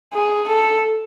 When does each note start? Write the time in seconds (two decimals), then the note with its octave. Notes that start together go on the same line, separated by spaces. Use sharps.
0.13 G#4
0.48 A4